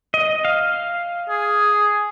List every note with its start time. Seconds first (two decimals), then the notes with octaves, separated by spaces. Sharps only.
0.14 D#5
0.45 F5
1.29 G#4